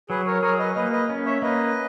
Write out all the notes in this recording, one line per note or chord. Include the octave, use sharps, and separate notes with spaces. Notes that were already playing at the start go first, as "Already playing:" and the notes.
F#3 G#4 B4
A#4 C#5
G#4 A#4 C#5
B4 D#5
A#3 B4 D#5
B4 D#5
C#4
C#5 E5
A#3 B4 D#5